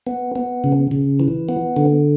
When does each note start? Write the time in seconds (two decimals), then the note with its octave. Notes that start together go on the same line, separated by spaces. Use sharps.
0.07 B3
0.35 B3
0.64 C#3
0.91 C#3
1.20 E3
1.49 B3
1.77 D3